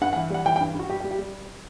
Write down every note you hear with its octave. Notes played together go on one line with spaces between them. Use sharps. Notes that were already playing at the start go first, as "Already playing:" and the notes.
G2 F#5
F#5
E3
G3 F#5
E3 G5
G5
G2
G2 F#4
G3 G4
G4
G3
G4
G3